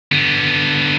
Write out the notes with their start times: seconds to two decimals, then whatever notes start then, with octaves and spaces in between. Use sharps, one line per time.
0.12 D3 B3